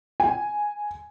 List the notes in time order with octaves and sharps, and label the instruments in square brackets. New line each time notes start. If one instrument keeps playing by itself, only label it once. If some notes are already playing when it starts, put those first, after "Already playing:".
[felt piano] G#5